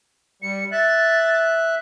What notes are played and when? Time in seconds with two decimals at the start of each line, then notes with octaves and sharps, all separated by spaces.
0.42 G3 C#7
0.72 E5 F#6 A6